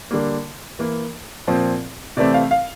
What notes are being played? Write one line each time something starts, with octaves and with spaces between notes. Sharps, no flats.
D3 G3 A#3
E3 A#3
A#2 F3 C4
C3 E3 A3 C4 D5
F5
F5